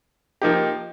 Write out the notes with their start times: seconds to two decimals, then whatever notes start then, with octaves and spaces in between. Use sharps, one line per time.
0.42 F3 A#3 D#4 G4